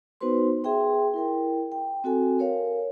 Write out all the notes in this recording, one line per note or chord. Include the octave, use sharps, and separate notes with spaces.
B3 D#4 F#4 B4 C5 C6
G#4 E5 G5 C6
E4 A#4 G5
G5
C4 F#4 A4 G#5
A#4 C#5 F5